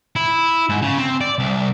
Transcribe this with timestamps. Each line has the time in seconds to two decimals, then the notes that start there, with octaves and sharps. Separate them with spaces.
0.16 E4
0.69 G#2
0.82 C#3
0.98 C4
1.21 D5
1.38 C2